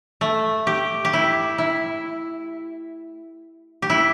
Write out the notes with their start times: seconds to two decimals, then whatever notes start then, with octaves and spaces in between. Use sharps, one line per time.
0.21 A3
0.67 G4
1.05 G4
1.13 E4
1.58 E4
3.82 G4
3.90 E4